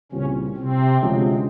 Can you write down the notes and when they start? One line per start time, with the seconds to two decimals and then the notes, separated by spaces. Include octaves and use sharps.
0.12 C2 A#2 C#3 G3 C4 C#4
0.57 C3 C4
1.02 D2 C3 F3 G#3 C#4